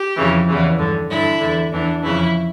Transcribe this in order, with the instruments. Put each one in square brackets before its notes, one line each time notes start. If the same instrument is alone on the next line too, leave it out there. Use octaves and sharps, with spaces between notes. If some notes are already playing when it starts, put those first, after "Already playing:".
Already playing: [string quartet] G4
F2 C#3 E3
E2 C#3 E3
G2 D3
G2 D3 E4
E2 D3
E2 E3 D4
F2 C#3 E3 E4